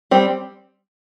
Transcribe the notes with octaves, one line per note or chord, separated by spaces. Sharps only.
G3 C4